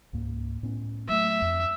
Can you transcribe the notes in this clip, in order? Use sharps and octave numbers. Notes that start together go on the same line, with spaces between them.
C#2 G#2 A#3
A2 B3 C#4
F#3 A3 E5
F2